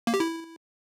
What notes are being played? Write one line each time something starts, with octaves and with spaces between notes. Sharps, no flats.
A#3
G4
E4